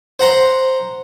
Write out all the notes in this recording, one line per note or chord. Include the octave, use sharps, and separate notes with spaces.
C5 F#5 A#5 C6